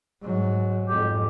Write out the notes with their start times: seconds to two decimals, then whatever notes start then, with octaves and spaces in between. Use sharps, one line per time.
0.22 G#2 F#3
0.88 F2 G#2 G4